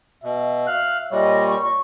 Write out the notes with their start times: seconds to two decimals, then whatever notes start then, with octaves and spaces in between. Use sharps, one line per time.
0.24 B2 E5
0.67 F5 F#6
1.12 A#2 G3 C#5 D#5
1.46 C#6